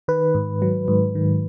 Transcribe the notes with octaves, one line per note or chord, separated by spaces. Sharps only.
D#3 B4
G#2
F#3
G#2
D#3